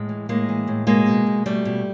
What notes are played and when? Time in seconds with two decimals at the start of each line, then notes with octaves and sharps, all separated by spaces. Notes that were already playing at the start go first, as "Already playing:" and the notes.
Already playing: A2 G#3
0.09 E3
0.29 A2 G#3 A#3
0.49 E3
0.68 A2
0.87 B2 G#3 A#3
1.07 B2
1.27 B2
1.46 B2 G3 A3
1.65 B2